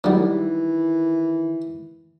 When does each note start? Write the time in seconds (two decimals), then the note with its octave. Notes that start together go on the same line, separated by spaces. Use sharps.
0.04 D#3 E3 F#3 G3